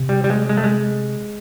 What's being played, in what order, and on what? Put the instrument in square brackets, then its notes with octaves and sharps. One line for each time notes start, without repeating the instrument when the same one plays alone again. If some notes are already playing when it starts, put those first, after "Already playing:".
Already playing: [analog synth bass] C3
[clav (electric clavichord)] G3
G3
G#3
G#3
A3
G#3